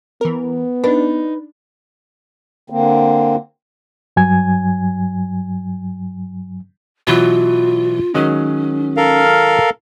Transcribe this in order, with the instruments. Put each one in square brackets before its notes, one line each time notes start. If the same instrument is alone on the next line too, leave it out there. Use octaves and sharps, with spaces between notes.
[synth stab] E3 A#4 [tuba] B3
[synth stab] D4 [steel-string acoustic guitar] D#4 [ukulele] B4
[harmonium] D3 A#3 C4
[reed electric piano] G2 F#3 G#5 G#6
[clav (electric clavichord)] B2 E3 F#3 [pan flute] F4
[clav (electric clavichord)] D#3 F#3 G#3 [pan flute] C#4
[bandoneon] A4 A#4 F5